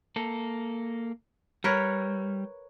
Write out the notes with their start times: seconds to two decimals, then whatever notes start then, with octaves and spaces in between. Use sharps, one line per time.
0.16 A#3 A4
1.64 G3 A#4 B4 C#5